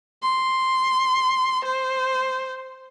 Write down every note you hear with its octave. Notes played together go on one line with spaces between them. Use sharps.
C6
C5